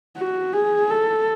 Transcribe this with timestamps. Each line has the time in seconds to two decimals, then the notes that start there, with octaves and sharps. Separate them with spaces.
0.17 F#4
0.53 G#4
0.90 A4